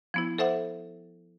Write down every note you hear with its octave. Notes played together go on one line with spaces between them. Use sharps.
F3 B3 E4
A4 C5 E5 F#5